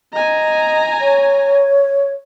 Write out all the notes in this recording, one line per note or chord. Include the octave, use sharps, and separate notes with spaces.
D#5 G#5 A#5
C#5